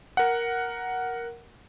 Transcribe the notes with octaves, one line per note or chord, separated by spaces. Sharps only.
A#4 F#5